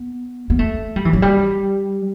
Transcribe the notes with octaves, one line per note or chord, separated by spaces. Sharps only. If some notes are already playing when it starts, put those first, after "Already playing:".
Already playing: B3
B3
A3
G3
E3
F#3
G3